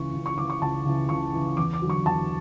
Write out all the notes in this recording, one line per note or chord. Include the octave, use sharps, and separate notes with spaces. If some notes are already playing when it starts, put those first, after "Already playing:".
Already playing: C#2 C#3 E3 C#6
C#2
C#6
C#3 E3 D6
C#6
C#2 A5
C#3 E3
C#2 C#6
C#3 E3
E2 D6
D6
D3 F#3
C#6
E2 A5